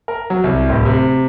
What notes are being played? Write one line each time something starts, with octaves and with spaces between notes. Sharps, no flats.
A#4
F#3
C2
D1
C3